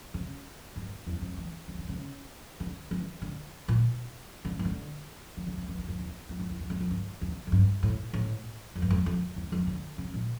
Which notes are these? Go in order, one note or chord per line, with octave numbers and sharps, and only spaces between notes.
C#3
G2
E2
F2
E3
D3
D3
C#3
D3
E3
D3
A#2
D3
E3
D3
E3
D3
C#3
E3
D3
F2
E2
F2
E2
E2
F2
F2
F2
G2
E2
F2
G2
A2
A2
F2
G2
F2
F2
E2
F2
D3
C#3
A#2